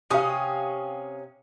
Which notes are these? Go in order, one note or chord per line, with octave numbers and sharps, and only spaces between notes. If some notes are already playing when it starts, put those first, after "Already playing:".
C3 C#4 F5 D#6